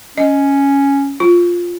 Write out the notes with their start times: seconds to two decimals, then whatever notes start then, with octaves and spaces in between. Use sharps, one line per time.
0.18 C#4 D#5
1.20 F4